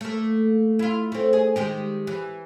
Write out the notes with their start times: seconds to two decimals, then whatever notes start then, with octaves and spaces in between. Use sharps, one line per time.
0.01 A3 A#3
0.79 E4 F4
1.12 A3 C4
1.33 G#4
1.56 D#3 G#3 G4
2.07 E3